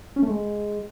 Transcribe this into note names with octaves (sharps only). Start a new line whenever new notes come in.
C#4
A3
G#3